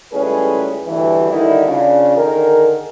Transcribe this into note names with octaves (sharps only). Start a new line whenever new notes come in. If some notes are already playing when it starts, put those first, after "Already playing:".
C#2 A2 G3 C#4 G#4 B4
D2 G2 B2 E3
D3 D#3 G3 D#4 E4
C#3 D4 F4
D3 D#3 G#4 A#4